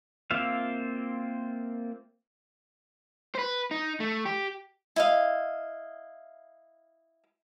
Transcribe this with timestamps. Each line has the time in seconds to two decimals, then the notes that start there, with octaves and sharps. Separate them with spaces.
0.31 A#3 C4 F4 E5 F5
3.35 B4 C5
3.71 D#4
4.00 A3
4.25 G4
4.96 E4 D#5 F5